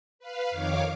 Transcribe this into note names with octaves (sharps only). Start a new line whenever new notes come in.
B4 F5
F2 D#3 C#5 F5 D6